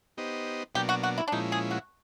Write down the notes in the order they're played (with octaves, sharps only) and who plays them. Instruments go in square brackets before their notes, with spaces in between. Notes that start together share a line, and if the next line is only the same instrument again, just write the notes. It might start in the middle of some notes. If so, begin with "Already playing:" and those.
[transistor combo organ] B3 D#4 G4 C5 D#5
[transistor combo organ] B2 F#3 A#3 D4 [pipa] G4
[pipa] F#4
F#4
E4
D4
[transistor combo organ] A#2 F3 G#3 C#4 E4 [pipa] D#4
[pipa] G#4
F#4